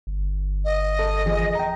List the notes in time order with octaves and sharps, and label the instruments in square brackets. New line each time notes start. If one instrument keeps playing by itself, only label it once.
[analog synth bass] G1
[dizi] D#5
[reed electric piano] A4
E2 F3 G#4
G5 A#5